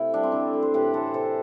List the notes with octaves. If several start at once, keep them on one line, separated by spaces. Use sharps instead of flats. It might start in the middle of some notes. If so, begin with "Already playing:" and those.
Already playing: C3 A3 E4
G3 D4
C4
D3 D4
A3
C5
A2 G4 B4
E3 A4 C5
C3 A4 C5